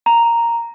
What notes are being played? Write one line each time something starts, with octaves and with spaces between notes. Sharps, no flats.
A#5